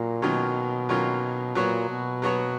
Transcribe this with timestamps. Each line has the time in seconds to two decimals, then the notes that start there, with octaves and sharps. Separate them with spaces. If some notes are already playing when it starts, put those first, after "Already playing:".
Already playing: A#2 F#3 A#3
0.22 B2 D#3 F#3 A#3 C#4 F4
0.89 D#3 F#3 A#3 C#4 F4
1.55 A#2 F#3 B3 F#4 C#5
1.88 B2
2.22 F#3 B3 F#4 C#5